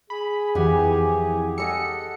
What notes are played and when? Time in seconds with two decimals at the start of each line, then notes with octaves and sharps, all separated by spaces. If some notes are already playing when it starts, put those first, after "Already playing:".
0.10 G#4 B5
0.55 F2 E3 G4 F#5 G#5
1.58 A4 D#5 F#5 C#7